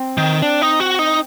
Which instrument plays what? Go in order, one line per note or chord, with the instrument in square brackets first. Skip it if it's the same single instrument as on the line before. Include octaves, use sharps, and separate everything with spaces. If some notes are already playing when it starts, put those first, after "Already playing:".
Already playing: [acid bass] C4
[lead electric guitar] D#3
D4
D#4
F#4
D#4